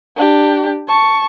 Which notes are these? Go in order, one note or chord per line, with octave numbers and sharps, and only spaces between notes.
D4 G4
A5 C#6